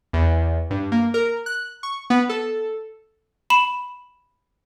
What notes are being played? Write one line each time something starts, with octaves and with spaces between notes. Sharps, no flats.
E2
G2
A#3
A#4
F#6
C#6
B3
A4
B5 E7